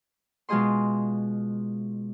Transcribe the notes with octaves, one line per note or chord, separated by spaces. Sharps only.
B2 G#3 F4 G#4 D#5 C6